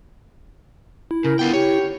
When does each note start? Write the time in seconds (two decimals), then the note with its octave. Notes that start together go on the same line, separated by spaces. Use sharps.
1.11 E4
1.24 C#3 A#4
1.39 D3 B3 F4 G5
1.53 G4 C#5